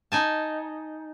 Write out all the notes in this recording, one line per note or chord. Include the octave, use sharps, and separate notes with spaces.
D#4 G#5 A5